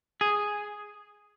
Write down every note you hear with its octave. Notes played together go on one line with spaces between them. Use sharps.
G#4